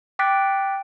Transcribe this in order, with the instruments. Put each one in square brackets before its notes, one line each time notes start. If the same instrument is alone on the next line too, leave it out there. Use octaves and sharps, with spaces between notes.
[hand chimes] G5 D6 F#6 A6 B6 D7